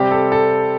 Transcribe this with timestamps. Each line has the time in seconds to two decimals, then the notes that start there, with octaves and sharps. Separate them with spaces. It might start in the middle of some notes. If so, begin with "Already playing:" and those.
Already playing: C3 G3 C4 G4
0.11 A4
0.32 A4